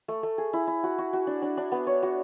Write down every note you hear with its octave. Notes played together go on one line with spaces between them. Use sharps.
A3
A3
G#4
E4
E4
F#4
F#4
F#4
D4
D4
D4
B3
C#5
F#4